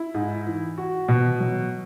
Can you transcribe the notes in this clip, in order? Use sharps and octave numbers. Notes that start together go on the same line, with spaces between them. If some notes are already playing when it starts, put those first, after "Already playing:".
Already playing: E4
G#2
E3
F#4
B2
F#3